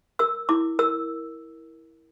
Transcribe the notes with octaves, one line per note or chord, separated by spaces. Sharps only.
A#4 E6
E4 D6
A#4 E6